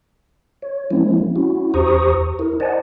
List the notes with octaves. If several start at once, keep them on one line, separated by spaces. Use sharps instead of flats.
C#5
F3 G#3 A#3 C4 C#4 E4
C#4 E4 F#4
E2 G4 C5 A#5 C#6 D#6
E4 A#4
C5 D5 D#5 F#5 G#5 A5